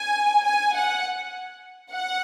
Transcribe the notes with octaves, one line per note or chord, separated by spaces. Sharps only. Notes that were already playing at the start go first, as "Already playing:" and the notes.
Already playing: G#5
G#5
F#5
F#5